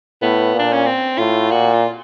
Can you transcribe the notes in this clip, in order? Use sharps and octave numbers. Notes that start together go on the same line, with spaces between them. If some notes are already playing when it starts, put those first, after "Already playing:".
A2 B3
A#2 D4
C#4
C4
A2 F4
A#2 F#4
F4